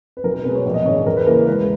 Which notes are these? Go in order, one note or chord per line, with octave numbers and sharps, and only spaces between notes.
B4
B1 A#4
A#4
B2 G#3 B4
C#5
A#1
D#5
G#2 D#3 C#5
E2 A#4
B4
C#3 E3 A#3 A#4
E1 B4